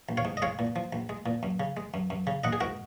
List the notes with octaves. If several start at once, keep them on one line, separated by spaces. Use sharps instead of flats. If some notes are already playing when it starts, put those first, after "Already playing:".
A#1
C#5 F5
G#2
D#5
G#3 C#5 F5
A#2
F3
A#1
G#3
A#2
F#2
C#3
G#3
F#2
F#2
C#3
A#1 D#5 F#5
G#4
G#2 F#4 A#4